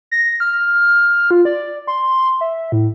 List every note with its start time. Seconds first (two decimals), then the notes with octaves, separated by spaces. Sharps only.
0.11 A#6
0.40 F6
1.31 F4
1.45 D5
1.87 C6
2.41 E5
2.72 A2